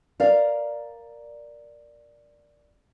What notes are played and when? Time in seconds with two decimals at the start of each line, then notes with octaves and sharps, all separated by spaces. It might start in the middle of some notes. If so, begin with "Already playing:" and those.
0.20 A#4 D5 F5